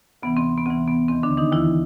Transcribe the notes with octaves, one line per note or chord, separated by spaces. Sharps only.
D2 C3 E3 B3
C4
B3
D2 C3 E3 C4
B3
D#2 D#3 C4
D3 D4
D#3 D#4
D#2 D#3 E3 E4